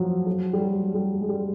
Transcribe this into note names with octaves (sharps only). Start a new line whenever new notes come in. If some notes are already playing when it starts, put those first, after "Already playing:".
Already playing: F3 F#3
F#3
G3
F#3
G3
G#3
G3